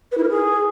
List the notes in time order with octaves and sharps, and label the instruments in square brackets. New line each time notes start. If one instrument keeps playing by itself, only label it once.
[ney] B4
E4
A#4
G#4